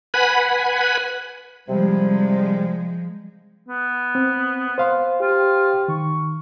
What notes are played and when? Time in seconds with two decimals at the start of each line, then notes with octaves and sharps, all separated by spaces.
0.14 B4 F#5 G#5 B5
1.69 C3 F3 G3 G#3
3.68 B3
4.15 C4
4.78 C5 F5 C6
5.21 F4 G4
5.88 D#3 C#6